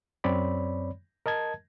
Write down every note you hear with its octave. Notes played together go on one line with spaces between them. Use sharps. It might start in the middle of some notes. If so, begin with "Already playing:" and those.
F#2 C4 C#5 D5 B5
A#4 D#5 A5 G#6